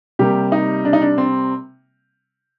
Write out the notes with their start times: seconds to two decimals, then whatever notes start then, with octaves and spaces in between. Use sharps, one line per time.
0.19 C3 G3 A#3 G4
0.52 D#4
0.85 D4
0.93 D#4
1.02 D4
1.18 C4